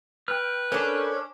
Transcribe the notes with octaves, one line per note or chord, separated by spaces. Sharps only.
B4 G5 F6
C#4 D4 A4 A#4 C5